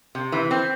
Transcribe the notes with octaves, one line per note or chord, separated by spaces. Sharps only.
C3
E3
C4